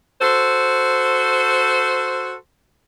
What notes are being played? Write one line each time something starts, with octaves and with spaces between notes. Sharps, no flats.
F#4 A4 C5